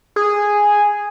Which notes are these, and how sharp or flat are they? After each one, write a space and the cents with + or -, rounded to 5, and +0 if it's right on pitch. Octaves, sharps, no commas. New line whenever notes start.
G#4 -5